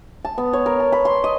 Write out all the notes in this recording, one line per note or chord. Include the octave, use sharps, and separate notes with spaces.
A5
B3
C#5
A#4
A5
B5
C6
D#5